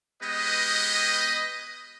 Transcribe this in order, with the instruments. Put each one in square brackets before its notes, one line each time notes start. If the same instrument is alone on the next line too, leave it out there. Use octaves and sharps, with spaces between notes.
[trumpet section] G#3 B3 G4 B4 D#5